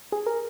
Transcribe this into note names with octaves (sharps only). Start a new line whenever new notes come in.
G#4
A#4